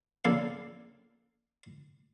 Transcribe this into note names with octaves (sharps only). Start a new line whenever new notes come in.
A#1 C#3 A#3 A4 D5 F5